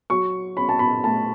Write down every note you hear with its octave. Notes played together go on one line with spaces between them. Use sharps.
F#3 C#6
C#4 B5
A5
B5
A3 A5